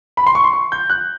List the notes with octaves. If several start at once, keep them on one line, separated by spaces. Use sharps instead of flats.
B5
C6
C#6
C6
C#6
G6
F#6